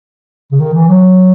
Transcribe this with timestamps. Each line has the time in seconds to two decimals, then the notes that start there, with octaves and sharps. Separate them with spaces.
0.52 C#3
0.60 D#3
0.74 E3
0.88 F#3